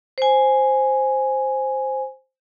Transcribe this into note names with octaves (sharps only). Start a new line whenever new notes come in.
C5 G#5